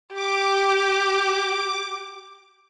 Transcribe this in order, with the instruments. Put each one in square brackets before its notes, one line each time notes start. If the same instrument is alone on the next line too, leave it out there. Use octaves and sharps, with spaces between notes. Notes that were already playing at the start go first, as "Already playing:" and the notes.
[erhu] G4 [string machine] D6